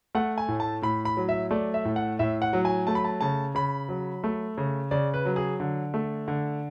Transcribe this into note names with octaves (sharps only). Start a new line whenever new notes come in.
A3 F#5
G#5
A2
A5
A2 B5
B5
F#3
E5
A3 D5
E5
A2
F#5
A2 E5
F#5
F#3
G#5
A3 A5
B5
A5
C#3 A5
C#3 B5
F#3
A3
C#3
C#3 D5
B4
F#3
G#4
D3
A3
D3